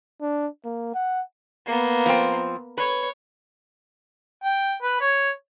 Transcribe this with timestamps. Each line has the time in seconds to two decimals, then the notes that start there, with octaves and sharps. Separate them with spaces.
0.21 D4
0.65 A#3
0.94 F#5
1.66 A#3 B3
2.06 F3 C4
2.77 B4 C#5
4.44 G5
4.83 B4
5.01 C#5